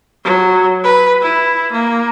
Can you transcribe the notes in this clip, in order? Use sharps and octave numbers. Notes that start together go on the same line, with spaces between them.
F#3
B4
E4
A#3